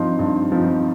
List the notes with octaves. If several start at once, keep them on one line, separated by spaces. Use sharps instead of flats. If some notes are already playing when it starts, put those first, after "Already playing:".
Already playing: G2 F3 C4 D#4 C6
G2
F3 C4 D#4